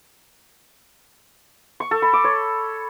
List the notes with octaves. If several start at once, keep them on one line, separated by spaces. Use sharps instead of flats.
C#6
A4
B5
D6
C#5